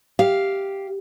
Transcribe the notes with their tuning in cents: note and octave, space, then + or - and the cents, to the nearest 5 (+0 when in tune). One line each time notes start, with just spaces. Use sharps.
G4 +0 F5 +0